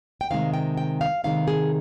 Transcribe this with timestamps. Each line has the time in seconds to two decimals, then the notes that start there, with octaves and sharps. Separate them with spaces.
0.21 G5
0.30 C3 D#3 G#3 F5
0.54 G5
0.78 G5
1.01 F5
1.24 C3 D#3 G#3 F5
1.48 G#4